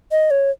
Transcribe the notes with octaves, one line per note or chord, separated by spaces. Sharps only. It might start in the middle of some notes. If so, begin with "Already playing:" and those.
D#5
C#5